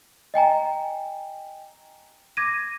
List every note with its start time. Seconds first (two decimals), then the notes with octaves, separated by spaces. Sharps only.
0.34 D#5 G5 G#5 A#5
2.37 D6 G#6 A#6 D#7